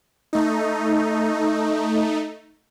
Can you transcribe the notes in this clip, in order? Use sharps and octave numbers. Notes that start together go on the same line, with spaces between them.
A3 D#4